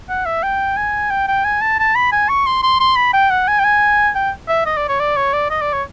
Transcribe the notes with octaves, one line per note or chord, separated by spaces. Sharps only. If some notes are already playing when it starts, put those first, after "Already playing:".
F#5
E5
G5
G#5
G5
G5
G#5
A5
A5
B5
G#5
C#6
C6
C6
C6
B5
G5
F#5
G#5
G5
G#5
G5
E5
D#5
D5
C#5
D5
C#5
D5
D#5
D5
C#5